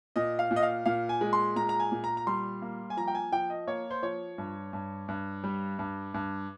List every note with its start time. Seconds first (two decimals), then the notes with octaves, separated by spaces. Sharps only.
0.16 A#2 D#5
0.39 F5
0.51 A#2
0.56 D#5
0.63 F5
0.86 A#2 F5
1.09 G#5
1.21 G#3
1.33 C6
1.56 A#2 A#5
1.69 A#5
1.80 G#5
1.92 A#2
2.04 A#5
2.17 A#5
2.27 G3 C6
2.62 A#3
2.90 G#5
2.97 F3 A#5
3.08 G5
3.15 G#5
3.32 F3 G5
3.50 D#5
3.67 A#3 C#5
3.91 C5
4.03 F3 C#5
4.38 G2
4.73 G2
5.08 G2
5.44 G3
5.79 G2
6.14 G2